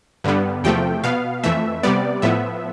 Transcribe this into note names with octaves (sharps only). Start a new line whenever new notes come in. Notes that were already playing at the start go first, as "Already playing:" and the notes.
G2 D3 G3 B3
E2 C3 F3 A3 G5
B2 B3 F5
F2 E3 A3 E5
C3 G3 B3 D5
A2 F3 B3 E5